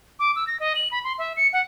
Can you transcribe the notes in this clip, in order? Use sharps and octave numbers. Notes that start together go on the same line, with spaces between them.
D6
E6
A#6
D#5
F#7
B5
C6
E5
C#7
F#5